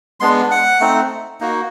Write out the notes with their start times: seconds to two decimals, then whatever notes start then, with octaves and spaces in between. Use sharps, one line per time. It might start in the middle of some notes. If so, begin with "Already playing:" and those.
0.20 G#3 B3 D4 C6
0.51 F#5
0.80 A3 C4 D#4
1.40 A#3 D#4 F#4